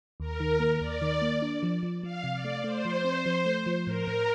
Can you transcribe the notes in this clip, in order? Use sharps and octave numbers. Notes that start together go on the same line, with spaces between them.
D#2 A#4
D#3
A#3
D#2 D5
D#3
A#3
D4
F3
F3
F3 F5
C3
D5
A3
A3 C5
F3
C4
F3
A3
F3
A2 A#4
A2